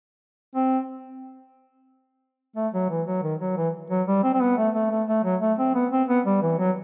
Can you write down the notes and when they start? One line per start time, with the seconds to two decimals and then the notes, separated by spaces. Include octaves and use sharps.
0.55 C4
2.56 A3
2.74 F#3
2.90 E3
3.07 F#3
3.23 D#3
3.41 F#3
3.57 E3
3.90 F#3
4.07 G3
4.23 C4
4.34 C4
4.41 B3
4.57 A3
4.74 A3
4.91 A3
5.08 A3
5.24 F#3
5.41 A3
5.59 C4
5.75 B3
5.92 C4
6.09 B3
6.26 G3
6.42 E3
6.59 F#3